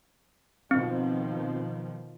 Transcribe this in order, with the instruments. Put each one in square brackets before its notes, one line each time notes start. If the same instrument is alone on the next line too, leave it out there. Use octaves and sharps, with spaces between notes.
[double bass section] B2 D#3 F3 [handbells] C4